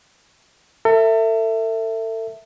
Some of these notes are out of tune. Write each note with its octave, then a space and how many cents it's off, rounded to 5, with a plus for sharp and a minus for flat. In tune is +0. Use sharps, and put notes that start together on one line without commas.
A4 +40 E5 +0